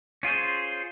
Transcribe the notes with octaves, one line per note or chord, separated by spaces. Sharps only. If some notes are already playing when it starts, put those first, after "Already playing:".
C#4 F4 G#4 C5